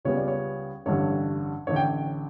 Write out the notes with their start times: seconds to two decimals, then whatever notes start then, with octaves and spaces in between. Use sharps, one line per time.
0.05 C#2 C#3 G3 B3 C#5
0.17 D5
0.28 C#5
0.86 A1 G2 D3 G3 C#5
1.67 A1 D3 C#5
1.76 G5